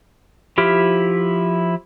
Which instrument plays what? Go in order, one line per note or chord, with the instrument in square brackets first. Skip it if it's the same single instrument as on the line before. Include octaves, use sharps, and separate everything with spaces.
[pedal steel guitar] F3 E4 G4 F6